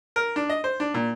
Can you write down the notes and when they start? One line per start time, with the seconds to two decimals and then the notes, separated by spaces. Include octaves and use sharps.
0.16 A#4
0.36 D4
0.50 D#5
0.64 C5
0.80 D4
0.94 A#2